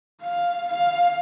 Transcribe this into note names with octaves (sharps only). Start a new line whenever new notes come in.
F5
F5